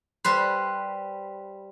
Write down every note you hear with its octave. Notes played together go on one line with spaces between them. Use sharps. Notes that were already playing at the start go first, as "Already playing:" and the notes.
G3 B4 C5